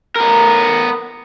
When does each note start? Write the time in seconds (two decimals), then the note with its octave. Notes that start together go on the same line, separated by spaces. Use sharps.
0.16 B3 A#4